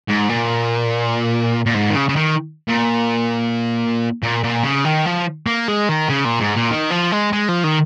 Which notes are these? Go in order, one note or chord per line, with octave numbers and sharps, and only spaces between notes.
G#2
A#2
A#2
G#2
D#3
C#3
C#3
D#3
A#2
A#2
A#2
C#3
D#3
F3
A#3
G#3
D#3
C#3
A#2
G#2
A#2
D#3
F3
G#3
G#3
F3
D#3